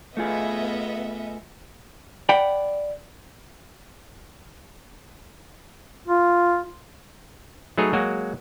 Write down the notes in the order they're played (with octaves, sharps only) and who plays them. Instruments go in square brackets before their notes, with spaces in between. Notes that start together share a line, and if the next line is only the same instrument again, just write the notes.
[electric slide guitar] A3 F4 G#4 [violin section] B3 D#5 E5
[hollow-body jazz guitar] D5 F#5 G5 B5
[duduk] F4
[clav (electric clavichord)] F#3 A3 D#4 G#4 B4 C#5
F#3 G#3 A#3 F#4